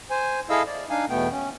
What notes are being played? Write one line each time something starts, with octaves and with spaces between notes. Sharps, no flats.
C5 G#5
E4 G#4 A4 D#5 F5 E6
D5
D4 D#4 F5 G#5
E2 B2 A3 B3 G5
C#4